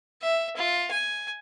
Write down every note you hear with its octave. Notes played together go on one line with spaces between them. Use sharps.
E5
F4
G#5